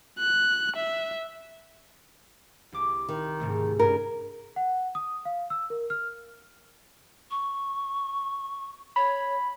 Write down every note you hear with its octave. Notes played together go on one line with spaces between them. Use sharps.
F#6
E5
C2 D6
D#3
G#2 C3 A3
G2 C#4 A#4
F#5
D#6
F5
E6
A#4
F6
C#6
C#5 B5